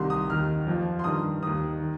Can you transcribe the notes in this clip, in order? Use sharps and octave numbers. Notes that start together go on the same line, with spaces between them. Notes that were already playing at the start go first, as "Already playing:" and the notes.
Already playing: C2 C3 D#3 C6
D#6
D#2 D#3 F6
F2 F3
C6
G2 D#3 D#6
D#2 D#3 D#6
D#3